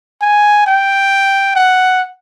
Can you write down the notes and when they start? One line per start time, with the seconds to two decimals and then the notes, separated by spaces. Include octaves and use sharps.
0.22 G#5
0.66 G5
1.56 F#5